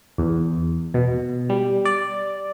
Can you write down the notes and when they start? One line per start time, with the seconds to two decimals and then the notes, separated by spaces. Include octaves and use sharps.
0.18 E2
0.94 B2
1.50 G3
1.85 D5